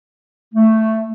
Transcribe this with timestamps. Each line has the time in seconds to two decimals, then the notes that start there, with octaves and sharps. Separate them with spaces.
0.54 A3